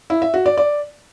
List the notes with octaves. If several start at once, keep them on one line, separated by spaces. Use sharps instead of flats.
E4
E5
F#4
D5
D5